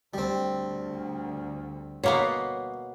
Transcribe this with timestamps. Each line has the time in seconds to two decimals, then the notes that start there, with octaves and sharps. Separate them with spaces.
0.14 D2 G3 C4
2.03 B2 A#3 B3 C#5